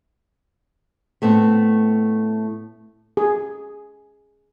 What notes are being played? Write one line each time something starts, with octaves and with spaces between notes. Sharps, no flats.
A2 A3 B3 C4
G#4